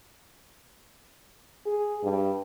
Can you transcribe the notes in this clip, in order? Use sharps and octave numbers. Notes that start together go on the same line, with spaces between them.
G#4
G2